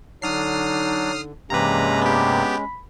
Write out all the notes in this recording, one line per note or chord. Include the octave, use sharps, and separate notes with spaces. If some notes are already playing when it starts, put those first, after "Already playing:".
D3 F#3 D4 D#4 D#6 F6 C7
G2 C3 E3 G#3 A#3 C#4 B4 A#5
B3 G4 B5